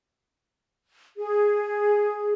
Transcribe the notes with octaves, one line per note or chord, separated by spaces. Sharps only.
G#4